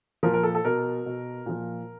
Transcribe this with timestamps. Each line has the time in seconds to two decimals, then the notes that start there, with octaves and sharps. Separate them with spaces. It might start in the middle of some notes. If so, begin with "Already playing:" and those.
0.23 F3 A#4
0.25 A#2
0.33 A#4
0.43 A4
0.55 A4
0.65 B2 A#4
1.06 B2
1.46 A#2 F3